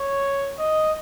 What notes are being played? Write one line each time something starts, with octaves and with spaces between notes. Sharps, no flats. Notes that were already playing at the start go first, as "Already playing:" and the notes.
Already playing: C#5
D#5